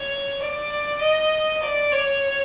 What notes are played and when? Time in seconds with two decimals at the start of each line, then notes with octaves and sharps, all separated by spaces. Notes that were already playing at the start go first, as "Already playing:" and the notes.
Already playing: C#5
0.41 D5
1.01 D#5
1.62 D5
1.92 C#5